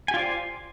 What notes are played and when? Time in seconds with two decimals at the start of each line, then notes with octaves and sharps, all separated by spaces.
0.08 G#5
0.11 G4
0.14 F4
0.17 D5
0.19 C5